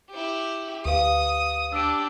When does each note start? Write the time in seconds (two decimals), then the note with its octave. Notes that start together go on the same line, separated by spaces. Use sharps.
0.10 E4 G4
0.85 D2 G4 B4 F5 D#6
1.73 D4 G4 E6 D7